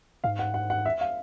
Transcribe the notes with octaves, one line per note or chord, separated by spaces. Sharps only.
G#2 F5
F#5
F#5
F#5
E5
F5